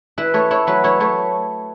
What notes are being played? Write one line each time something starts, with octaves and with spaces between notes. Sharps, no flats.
E4 B4
A3 C#5
E4 C#5
F#3 B4
E4 C#5
A3 C#5